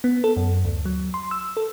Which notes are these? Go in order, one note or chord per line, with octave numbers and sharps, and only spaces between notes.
B3
A4
F#2
D2
F#3
C6
E6
A4